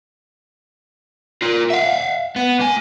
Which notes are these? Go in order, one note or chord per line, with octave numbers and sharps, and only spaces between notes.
F4 A#4
E5 F5
B3
A#3 G#5